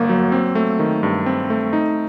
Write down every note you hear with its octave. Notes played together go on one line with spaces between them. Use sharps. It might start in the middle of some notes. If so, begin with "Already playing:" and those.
Already playing: G1 G2 A#3
F#3
C4
A3
D#3
G2
C4
A3
D#4